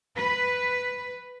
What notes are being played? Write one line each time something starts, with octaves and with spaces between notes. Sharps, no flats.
B4